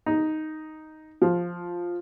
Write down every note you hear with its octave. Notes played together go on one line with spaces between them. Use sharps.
D#4
F3